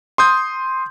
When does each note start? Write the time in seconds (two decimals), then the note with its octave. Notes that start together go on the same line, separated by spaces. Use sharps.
0.18 C6 D#6 G6